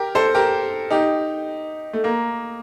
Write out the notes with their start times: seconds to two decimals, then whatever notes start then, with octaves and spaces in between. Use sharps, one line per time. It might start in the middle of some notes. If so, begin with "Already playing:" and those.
Already playing: G4 A#4
0.15 A4 C5
0.35 G4 A#4
0.90 D#4 G4
1.93 A3
2.04 A#3